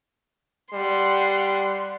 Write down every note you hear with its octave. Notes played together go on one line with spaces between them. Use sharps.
G3 F#5 C6